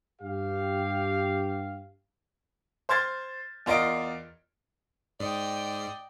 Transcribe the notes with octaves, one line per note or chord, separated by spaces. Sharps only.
G2 G4 F5
C5 C6 F6 G#6 A6
E2 F4 A#4 D5 D#5 D7
G#2 D5 D#5 G5